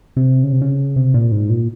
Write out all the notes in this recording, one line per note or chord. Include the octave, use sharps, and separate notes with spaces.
C3
C#3
C3
C#3
C3
A#2
G#2
A#2